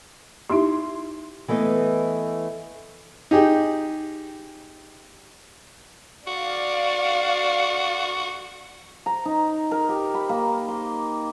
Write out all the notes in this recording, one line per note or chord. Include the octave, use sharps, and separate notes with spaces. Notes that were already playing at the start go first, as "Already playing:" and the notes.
D#4 E4 G4 C6
E3 A3 B3 D#5
D#4 G4 G#4
F#4 D5 F5
A#5
D#4
A#4
G4
B5
A#3
C6